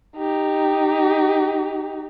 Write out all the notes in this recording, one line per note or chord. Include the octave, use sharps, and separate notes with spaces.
D#4 G4